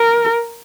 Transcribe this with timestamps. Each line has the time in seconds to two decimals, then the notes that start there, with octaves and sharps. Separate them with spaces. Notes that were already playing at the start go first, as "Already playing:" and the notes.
Already playing: A#4